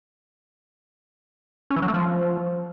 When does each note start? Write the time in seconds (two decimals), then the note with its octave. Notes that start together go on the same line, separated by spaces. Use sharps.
1.70 C#4
1.76 E3
1.82 F#3
1.88 A3
1.94 F3